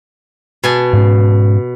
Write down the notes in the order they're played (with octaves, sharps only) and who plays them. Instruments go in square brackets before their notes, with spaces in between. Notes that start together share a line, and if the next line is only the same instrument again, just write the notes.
[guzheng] B2 G#5 A5
[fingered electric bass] G#2 C#4